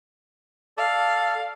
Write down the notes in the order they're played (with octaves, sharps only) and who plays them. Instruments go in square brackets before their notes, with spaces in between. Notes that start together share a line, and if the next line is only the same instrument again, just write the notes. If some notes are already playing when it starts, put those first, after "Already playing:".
[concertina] A4 D5 [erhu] F5